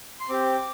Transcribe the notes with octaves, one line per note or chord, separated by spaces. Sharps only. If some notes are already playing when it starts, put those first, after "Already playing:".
C6
C4 G4 D6